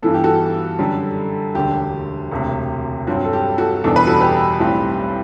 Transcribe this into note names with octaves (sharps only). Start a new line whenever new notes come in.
G2 E3 B3 A4
G4
F#4 A4
F#2 D3 G3
E1 D2 D3 G4
E1 D2 C3
G2 F#3 C4 F#4
A4
G4
F#4 A4
F#1 E2 B2 G3 D4 A4
B4
F#4 A4
G4 B4
B1 A2 G3 C4